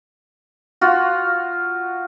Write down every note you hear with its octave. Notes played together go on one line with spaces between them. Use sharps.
F4 F#4